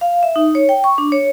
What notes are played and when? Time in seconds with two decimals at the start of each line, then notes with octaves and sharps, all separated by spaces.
0.01 F5
0.23 E5
0.36 D#4
0.55 C#5
0.69 G5
0.84 C#6
0.98 D4
1.12 C#5